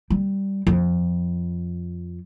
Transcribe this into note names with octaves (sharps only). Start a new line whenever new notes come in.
G3
F2